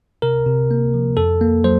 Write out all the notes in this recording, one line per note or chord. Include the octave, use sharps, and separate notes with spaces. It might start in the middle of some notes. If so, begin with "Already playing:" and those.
C3 A#4
C3
A#3
F3
F2 A4
A#3
F#3 C5